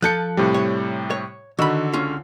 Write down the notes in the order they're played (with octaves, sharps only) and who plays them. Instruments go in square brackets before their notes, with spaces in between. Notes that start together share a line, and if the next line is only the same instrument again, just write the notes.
[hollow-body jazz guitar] F3 A4 [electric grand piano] F#6 G6 C#7
[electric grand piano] A2 C3 G3
[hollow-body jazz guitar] C#5
C#5
[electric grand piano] D3 F#4 E6 [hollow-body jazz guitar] D#3 B5
[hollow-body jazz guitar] C#2 C#4 F4